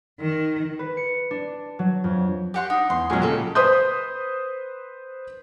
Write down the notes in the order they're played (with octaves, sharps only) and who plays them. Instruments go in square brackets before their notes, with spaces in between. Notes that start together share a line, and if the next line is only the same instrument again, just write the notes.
[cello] D#3
[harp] B4
C#7
D4
F#3
F2
[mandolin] G4 F#5 C6
[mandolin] D#4 [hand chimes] F#5
[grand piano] E2 [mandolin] C6
[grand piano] A#2 F#3 G#3 [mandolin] C#4 G#4
[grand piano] C#3 [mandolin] G4 A4
[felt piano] B4 C5 C6 D#6 G6